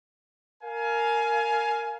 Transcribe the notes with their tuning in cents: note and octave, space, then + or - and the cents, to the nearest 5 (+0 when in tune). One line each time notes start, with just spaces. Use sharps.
A#4 -10 F5 +0 G#5 +20